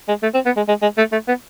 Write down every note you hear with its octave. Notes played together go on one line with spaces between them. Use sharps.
G#3
A3
C4
B3
G#3
G#3
G#3
A3
A3
B3